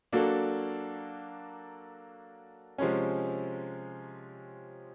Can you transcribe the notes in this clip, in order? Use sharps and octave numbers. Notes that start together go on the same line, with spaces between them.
F#3 A#3 D4 F#4 A4
C3 F3 G#3 C#4